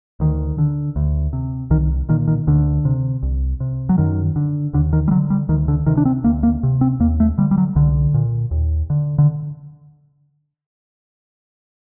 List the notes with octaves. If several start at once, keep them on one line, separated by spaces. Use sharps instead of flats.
D2 D#3
D3
D2
C3
C2 D#3
A#2 D#3
D#3
D2 D3
C3
C2
C3
F#3
F#2 D#3
D3
D#2 D3
D#3
G3
D3 F#3
G3
D2 D#3
D3
C3 D#3
D4
C4
D2 A#3
A#3
C3
C4
D#2 A#3
A3
D3 G3
G3
F#3
C2 D3
A#2
D#2
D3
D3